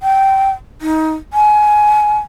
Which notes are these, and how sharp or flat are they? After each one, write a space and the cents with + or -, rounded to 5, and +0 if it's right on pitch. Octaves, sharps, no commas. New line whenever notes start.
G5 -15
D#4 +20
G#5 +20